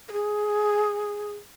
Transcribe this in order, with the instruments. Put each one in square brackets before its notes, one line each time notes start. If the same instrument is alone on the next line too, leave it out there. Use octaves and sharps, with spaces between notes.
[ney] A#4
G#4